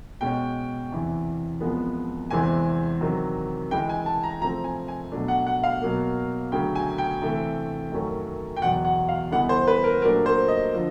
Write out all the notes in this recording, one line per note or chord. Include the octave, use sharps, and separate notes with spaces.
B2 G#3 C#4 G5
E2 C3 E3
C2 C3 F3 G#3 B3
E2 C3 E3 G#3 C4 G#5
C3 D#3 F#3
C#2 C#3 E3 G#3 G5
G#5
A5
A#5
C3 F3 A3 C4 A#5
G#5
G#5
B2 F#3 A3 D4
F#5
F#5
F5
B2 F#3 A#3
D2 C#3 F#3 A3 G5
G#5
G5
C3 E3 A3
F#2 D#3 F#3 A3 C#4
G5
E2 B2 F#3 F#5
F#5
F5
C#2 C#3 E3 G3 B3 F#5
C5
B4
A#4
A#2 F#3 A3 D4 A#4
C5
D#5
D3 F3